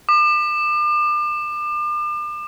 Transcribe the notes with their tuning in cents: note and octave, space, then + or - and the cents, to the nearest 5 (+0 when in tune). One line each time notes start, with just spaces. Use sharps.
D6 +40